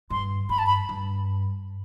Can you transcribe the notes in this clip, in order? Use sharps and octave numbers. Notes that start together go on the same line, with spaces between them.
G2 C6
G2 B5
A5
B5
G2